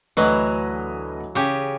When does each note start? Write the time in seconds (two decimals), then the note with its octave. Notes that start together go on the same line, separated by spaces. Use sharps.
0.17 D2 E3 F#3 B4 D#5
1.35 C#3 G4 G#5